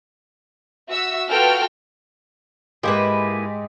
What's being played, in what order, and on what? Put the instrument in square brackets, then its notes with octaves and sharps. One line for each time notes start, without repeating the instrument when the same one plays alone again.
[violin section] F#4 E5 E6
F4 F#4 A4 B4 G5 F6
[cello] G#2 [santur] G#3 G4 B5 [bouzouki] A#3 E4 B4